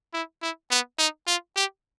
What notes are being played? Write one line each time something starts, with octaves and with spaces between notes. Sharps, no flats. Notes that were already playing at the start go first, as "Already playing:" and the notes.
E4
E4
B3
D#4
F4
G4